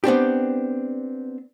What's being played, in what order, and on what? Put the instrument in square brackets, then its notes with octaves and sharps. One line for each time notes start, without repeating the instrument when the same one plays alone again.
[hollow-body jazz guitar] B3 C4 D4 G4